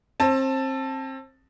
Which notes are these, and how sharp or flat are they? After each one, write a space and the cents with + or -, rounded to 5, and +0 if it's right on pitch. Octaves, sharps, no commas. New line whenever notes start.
C4 +30 A5 +5